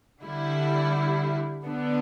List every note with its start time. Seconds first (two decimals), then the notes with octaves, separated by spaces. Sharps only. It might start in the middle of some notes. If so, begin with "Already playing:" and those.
0.21 D3 G3 E4
1.65 D3 B3 D4